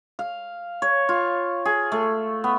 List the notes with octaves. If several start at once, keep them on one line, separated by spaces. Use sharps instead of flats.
F5
C#5
F4
G#4
A3
B3